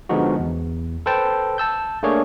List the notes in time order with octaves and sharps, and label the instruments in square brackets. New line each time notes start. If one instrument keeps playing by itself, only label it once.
[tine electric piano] D3 F3 G#3 B3 D#4 F#4
E2
A4 B4 C5 G5 A5
A5 E6 G6
A3 A#3 D4 G#4 C#5